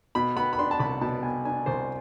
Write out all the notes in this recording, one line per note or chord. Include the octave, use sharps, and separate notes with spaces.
B2 B5
B3 B5
B5
D4 C6
A5
C2 B5
B2 A5
B3 G#5
D4 G#5
C2 C5